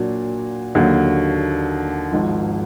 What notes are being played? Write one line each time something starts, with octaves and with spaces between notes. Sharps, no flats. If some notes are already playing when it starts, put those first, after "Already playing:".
Already playing: A#2 F#3 D4 F#4
D#2 D3 F#3
G#1 G#2 F3